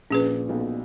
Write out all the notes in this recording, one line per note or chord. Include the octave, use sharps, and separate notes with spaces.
A#1 A#2 C#4 G#4 B4
B1 B2